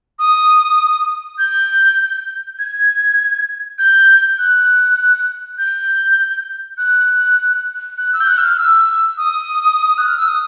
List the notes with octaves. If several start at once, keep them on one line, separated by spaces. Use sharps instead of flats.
D#6
G6
G#6
G6
F#6
G6
F#6
F#6
E6
G6
F#6
E6
F6
E6
D#6
F#6
F6
E6
D#6